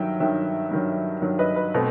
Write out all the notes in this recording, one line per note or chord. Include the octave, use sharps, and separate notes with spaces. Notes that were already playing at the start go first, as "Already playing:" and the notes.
Already playing: G2 D#3 F#3 E5 G5
G2 D#3 F#3 E5 G5
G2 D#3 F#3
G2 D#3 F#3
B4 D#5
B4
B2 A3 C4